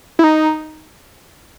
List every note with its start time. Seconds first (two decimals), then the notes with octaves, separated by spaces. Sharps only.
0.19 E4
0.24 D#4